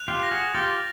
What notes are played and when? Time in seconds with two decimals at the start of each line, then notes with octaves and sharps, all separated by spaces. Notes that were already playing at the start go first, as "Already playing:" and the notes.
Already playing: F#6 F7
0.08 F4 G4
0.23 A#6
0.31 F#4 G#4
0.54 F4 G4 A6